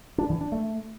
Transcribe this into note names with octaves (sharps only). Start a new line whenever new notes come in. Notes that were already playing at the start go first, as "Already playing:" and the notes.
D4
E3
D4
A3